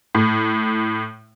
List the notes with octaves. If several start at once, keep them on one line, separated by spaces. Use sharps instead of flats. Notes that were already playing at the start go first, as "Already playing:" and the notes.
A2